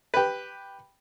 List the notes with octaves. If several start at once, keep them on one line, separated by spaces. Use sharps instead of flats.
G4 B4